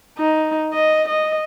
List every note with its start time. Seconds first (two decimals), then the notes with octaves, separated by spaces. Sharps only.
0.18 D#4
0.73 D#5
1.09 D#5